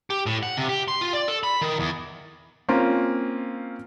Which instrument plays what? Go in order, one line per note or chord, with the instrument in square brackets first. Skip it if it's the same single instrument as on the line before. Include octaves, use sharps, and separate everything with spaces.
[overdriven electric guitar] G4
A2
F#5
C3
G4
C6
F4
D5
A4
B5
D#3
E2
[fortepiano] A#3 C4 C#4 F4